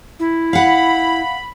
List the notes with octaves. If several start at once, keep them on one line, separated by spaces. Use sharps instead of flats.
E4
F5 F#5 B5